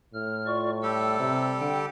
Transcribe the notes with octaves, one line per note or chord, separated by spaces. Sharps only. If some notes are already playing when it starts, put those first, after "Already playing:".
A2 F6
F4 D5 C#6
G3 G4 A4 E6
C3
D3 G5